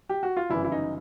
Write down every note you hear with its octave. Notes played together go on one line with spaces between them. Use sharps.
G4
F#4
F4
G1 F#2 C#3 E3 E4
E4
D#4